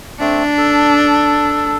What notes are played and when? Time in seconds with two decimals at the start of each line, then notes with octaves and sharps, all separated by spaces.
0.20 A3 C4 D4
0.58 A4